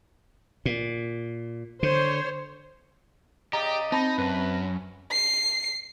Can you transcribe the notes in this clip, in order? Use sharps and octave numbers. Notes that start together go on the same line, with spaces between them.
A#2
D3 C5 C#5
C#3 G4 D5 D#5 A#5
C4 D#4 A5 B5 A#6
F#2 B4
C7